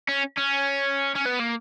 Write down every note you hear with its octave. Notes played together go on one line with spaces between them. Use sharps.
C#4
C#4
C#4
B3
A#3